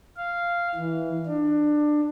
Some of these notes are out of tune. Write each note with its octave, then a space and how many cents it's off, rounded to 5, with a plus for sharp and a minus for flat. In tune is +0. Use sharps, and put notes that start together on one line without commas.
F5 -10
E3 -10
D4 +20